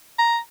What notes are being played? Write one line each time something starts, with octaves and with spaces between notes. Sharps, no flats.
A#5